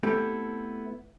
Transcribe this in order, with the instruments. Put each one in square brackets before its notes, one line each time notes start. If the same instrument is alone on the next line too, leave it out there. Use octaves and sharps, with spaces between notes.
[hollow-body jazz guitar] A3 B3 C4 E4 G4 A4